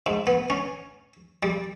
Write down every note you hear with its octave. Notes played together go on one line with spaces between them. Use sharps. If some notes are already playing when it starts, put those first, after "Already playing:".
G#2
B3
C#4
G3